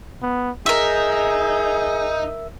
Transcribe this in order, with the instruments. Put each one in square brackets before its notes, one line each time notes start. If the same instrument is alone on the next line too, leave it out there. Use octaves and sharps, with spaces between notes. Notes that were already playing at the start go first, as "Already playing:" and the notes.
[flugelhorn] B3
[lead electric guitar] D#4 [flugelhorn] G#4 [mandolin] A#4 E5